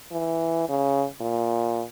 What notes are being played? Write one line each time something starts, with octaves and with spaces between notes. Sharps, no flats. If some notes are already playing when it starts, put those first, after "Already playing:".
E3
C#3
A#2